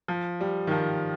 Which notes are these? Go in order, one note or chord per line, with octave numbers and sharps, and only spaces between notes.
F3
G3
D#3
F3